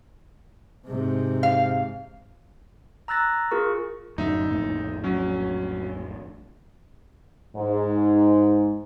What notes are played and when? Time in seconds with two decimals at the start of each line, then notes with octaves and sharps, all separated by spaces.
0.87 G#2 C3
1.43 F5
3.08 A#5 E6 F#6 A6 A#6
3.51 F4 G#4 A#4 C#6
4.18 F#2 A2 D3 D#4 E5
4.50 A#1 F2 A2
5.04 F#3 C#4
7.56 G#2